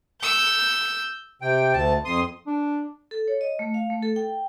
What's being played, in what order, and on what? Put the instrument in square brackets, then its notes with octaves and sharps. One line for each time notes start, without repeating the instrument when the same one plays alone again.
[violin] E6 G6
[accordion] C3 G5
D2 A5
F2 C6 D#6
[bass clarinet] D4
[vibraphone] A4
C#5
D#5
A3
F5
A3
A4
G5